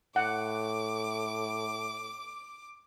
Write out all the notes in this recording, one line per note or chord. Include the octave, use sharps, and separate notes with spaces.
A2 F#5 D6